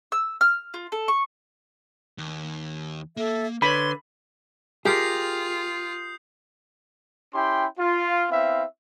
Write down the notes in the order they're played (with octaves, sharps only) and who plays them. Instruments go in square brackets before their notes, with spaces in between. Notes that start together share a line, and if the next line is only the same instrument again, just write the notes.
[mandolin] E6
F6
F4
A4
C#6
[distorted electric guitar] D#2
[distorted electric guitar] A#3 [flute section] A4 E5
[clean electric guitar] D3 [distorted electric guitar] E4 C6 [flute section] B4 C#5 [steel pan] B5
[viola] F4 [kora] G4 A#4 [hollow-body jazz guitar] G#4 [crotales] D#6 G6 C7
[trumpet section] C#4 E4 G4 G5 C6
F4
B3 C4 E4 E5 F5